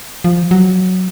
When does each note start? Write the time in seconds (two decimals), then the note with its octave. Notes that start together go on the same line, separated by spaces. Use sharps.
0.24 F3
0.51 F#3